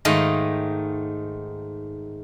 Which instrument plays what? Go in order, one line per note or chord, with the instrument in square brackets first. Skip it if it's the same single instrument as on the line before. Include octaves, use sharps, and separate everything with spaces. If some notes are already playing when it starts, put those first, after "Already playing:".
[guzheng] G#2 D#3 A3 D#5 F5